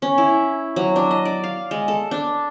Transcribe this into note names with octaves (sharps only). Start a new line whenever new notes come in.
C#4
E4
F#3
D4
D#5
D5
F5
G#3
A4
D4